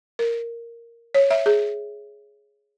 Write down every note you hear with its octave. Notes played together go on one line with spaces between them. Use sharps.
A#4
C#5
E5
G#4